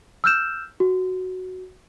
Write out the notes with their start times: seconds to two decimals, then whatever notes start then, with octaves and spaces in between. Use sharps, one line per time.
0.24 E6 F6 G6 E7
0.80 F#4